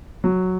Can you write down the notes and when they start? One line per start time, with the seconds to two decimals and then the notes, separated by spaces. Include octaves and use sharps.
0.24 F#3